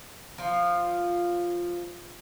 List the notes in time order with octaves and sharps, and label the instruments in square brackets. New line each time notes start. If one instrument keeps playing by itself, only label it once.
[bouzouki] F3 F4